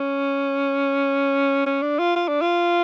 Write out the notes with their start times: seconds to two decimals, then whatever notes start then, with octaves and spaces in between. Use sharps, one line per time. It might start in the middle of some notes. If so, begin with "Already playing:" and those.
Already playing: C#4
1.66 C#4
1.82 D4
1.99 F4
2.16 F4
2.28 D4
2.41 F4